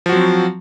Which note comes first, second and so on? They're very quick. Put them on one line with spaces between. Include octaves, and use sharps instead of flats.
F3 F#4 F#3 C4